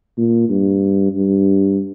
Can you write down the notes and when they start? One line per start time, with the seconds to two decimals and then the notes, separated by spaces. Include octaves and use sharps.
0.18 A#2
0.49 G2
1.13 G2